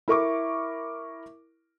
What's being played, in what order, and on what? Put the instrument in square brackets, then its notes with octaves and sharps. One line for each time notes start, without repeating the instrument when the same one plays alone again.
[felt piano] E4 A#4 C#6 D6